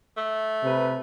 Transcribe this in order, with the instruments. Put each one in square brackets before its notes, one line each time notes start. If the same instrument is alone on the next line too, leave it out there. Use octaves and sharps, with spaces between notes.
[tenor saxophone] A3
[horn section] C3 B4